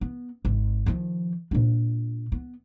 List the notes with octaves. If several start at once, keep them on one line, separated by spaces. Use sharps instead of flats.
B3
G#1
D#3 F3
A#2 D4
B3